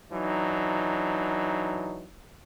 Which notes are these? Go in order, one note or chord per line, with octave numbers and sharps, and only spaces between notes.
E3 F#3 D4 D#4